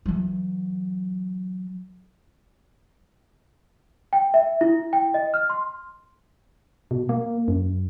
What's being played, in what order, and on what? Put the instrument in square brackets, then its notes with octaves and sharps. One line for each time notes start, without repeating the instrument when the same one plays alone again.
[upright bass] E3 F#3
[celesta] G5
E5
E4
G5
D#5
F6
C6
[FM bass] B2
A#3
F#2